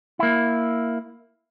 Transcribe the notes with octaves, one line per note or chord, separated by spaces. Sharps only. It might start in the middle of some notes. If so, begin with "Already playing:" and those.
A#3 E4